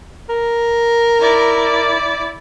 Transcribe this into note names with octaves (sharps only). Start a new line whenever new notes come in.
A#4
E4 D5